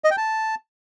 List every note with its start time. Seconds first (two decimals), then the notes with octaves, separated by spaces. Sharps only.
0.04 D#5
0.11 G5
0.17 A5